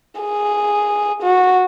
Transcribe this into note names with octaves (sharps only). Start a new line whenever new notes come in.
G#4
F#4